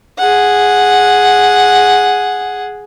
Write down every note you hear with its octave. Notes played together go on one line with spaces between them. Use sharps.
G#4 F#5